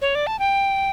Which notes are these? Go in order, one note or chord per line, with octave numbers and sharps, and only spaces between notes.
C#5
D5
A5
G5